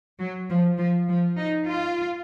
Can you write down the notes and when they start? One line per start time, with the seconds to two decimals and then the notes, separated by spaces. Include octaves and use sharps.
0.19 F#3
0.49 F3
0.78 F3
1.08 F3
1.37 D#4
1.67 F4